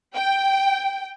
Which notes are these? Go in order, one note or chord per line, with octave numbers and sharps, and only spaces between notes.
G5